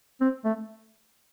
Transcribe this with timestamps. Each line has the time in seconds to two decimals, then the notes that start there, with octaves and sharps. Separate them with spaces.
0.21 C4
0.45 A3